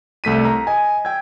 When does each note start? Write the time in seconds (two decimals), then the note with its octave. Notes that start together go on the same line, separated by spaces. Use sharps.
0.24 C2 A3 B6 D#7
0.45 A#5
0.67 D#5 G#5
1.05 G5 E6 G#6